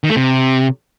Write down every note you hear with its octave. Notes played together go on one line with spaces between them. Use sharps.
D#3
A3
C3